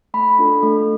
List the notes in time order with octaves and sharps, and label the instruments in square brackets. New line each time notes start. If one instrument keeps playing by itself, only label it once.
[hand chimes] A3 B5
D4 F4 A4
A3